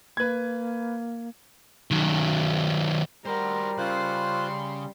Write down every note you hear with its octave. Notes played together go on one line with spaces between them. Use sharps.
A#3 B4 G#6
D#3 F#3
G3 F#4 A#4 C5
C#3 F4 C5 C6 F#6